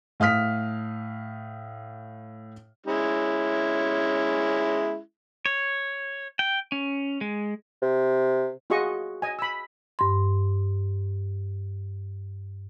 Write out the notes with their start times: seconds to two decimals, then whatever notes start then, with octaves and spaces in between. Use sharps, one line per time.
0.20 A2 F5 D#6 F6 B6
2.86 G#3 C#4 E4
5.46 C#5
6.39 G5
6.72 C#4
7.21 G#3
7.82 C3
8.70 F4 F#4 G#4 D#5 C#6
9.22 D#5 G#5
9.39 B5 E6
9.99 G2 C6